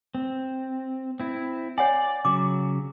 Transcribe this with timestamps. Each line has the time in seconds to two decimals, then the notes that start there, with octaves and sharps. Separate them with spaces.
0.15 C4
1.20 C4 E4
1.78 C#5 D5 F#5 G#5
2.25 C#3 F#3 D6